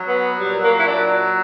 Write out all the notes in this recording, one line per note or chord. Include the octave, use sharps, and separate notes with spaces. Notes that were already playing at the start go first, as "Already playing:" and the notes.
Already playing: F#3
B3
A#2 G3
A#3
E4
F#3 D4